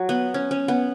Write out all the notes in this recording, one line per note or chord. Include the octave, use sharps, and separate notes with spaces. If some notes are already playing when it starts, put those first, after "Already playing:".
Already playing: F#3
B3
C#4
C#4
B3